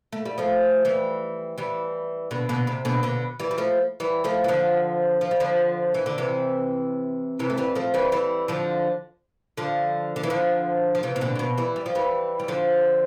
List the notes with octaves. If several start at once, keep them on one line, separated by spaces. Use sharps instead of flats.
A3
G3
F3 A3
E3 G3
E3 G3
B2 D3
B2 D3
C3
B2 D3
B2 D3
E3 G3
G3
F3 A3
E3 G3
F3 A3
E3
D3 F3
F3
G3
D3 F3
E3
D3
C3 E3
C3 E3
A3
E3 G3
F3 A3
E3 G3
E3 G3
D3 F3
D3 F3
D3
E3
D3 F3
F3
C3 E3
C3
B2 D3
A2
B2
E3 G3
G3
F3
E3 G3
G3
D3 F3